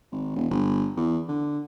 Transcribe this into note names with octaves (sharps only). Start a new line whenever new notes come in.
G#1
E1
G1
E2
D3